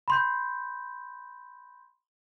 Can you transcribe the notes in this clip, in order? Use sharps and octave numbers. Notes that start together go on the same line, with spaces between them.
B5 C6 G6